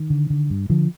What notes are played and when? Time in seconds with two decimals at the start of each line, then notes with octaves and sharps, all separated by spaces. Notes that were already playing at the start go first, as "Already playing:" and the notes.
Already playing: D#3
0.10 D3
0.30 D3
0.50 G2
0.70 D3 F3